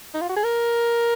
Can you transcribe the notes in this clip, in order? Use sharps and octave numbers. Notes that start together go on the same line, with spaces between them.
D#4
F4
F#4
G#4
A#4